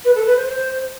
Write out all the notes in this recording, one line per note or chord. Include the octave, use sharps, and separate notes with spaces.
B4
A4
B4
C5
C5